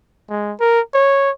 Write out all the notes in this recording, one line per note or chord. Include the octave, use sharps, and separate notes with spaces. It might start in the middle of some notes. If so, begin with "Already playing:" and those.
G#3
A#4
C#5